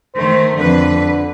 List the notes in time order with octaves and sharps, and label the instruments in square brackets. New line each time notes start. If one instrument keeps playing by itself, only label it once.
[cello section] D#3 A3 [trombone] C5
[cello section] F2 B4 [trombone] D3